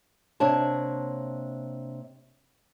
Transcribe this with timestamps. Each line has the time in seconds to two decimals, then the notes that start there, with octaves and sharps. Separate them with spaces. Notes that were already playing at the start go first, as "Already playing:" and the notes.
0.40 C3 A#3 D4 C#5 A5